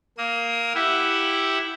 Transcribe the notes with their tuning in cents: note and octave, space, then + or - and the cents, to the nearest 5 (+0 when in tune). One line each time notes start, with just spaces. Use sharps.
A#3 +0 D#6 +35
E4 +0 G4 +0 F#5 +0